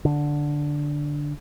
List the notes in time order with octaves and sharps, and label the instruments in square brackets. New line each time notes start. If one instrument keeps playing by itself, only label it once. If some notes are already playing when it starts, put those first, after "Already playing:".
[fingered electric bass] D3